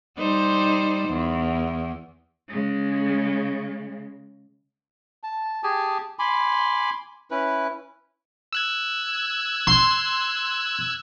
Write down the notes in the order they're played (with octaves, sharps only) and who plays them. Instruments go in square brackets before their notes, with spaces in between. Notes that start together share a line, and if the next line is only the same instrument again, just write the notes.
[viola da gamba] G3 D#4 C5
E2
[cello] C#3 G#3
[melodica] A5
G4 G#4 G#5 A5
G#5 B5 C6 D6
C#4 E4 B4
[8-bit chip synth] E6 F#6 G#6
[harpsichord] C6